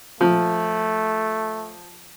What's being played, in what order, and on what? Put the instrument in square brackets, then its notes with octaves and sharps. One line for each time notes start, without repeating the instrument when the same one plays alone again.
[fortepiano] F3 [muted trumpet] A3